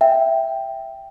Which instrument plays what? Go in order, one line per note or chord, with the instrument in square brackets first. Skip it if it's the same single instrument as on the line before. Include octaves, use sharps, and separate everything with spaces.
[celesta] E5 G5